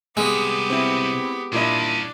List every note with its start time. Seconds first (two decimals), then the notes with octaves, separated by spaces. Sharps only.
0.17 C2 G#3 B3 G4
0.70 C4 E4
1.53 A#2 G3 C#4 D4 E4 D#5